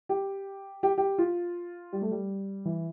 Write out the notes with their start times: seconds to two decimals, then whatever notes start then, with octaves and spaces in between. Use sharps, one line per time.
0.09 G4
0.83 G4
0.98 G4
1.18 F4
1.93 G3
2.02 A3
2.11 G3
2.65 E3